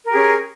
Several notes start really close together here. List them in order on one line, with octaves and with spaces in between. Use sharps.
A#4 G4 G#4 C#4